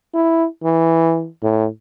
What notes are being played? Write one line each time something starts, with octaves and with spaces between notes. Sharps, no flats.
E4
E3
A2